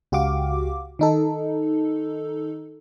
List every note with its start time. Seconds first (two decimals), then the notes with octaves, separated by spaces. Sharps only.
0.12 C#2 F#4 G4 F5 D6
0.99 D#3 D#4 A4